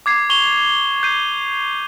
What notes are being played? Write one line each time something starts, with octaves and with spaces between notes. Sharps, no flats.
D6 G#6 C7
C#6 F7 G7
G6 C7 D#7